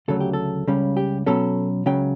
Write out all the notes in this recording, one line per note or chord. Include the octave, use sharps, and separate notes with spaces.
D2 C#3 F#3 A3 A4
G4
A4
C#2 C#3 G3 C#4
G4
B2 F#3 C#4 A4
C#2 C#3 F#3 C#4 G5